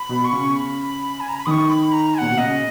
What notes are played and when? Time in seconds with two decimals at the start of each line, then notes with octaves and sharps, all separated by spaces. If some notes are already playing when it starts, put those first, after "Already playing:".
Already playing: B5
0.09 B2
0.25 C#6
0.32 C#3
0.55 B5
1.20 G#5
1.29 A#5
1.38 B5
1.46 D#3 C#6 D#6
1.69 B5
1.93 A#5
2.15 G#5
2.18 A#2 F#5
2.30 B2
2.38 C#3 D#5